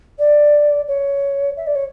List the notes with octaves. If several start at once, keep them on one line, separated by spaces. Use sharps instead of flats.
D5
C#5
E5
D5
C#5